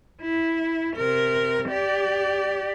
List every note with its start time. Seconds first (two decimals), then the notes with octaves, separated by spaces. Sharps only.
0.21 E4
0.96 C3 A#4
1.68 G4 D5